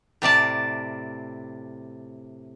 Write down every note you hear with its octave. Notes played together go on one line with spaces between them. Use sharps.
A2 C3 D5 A5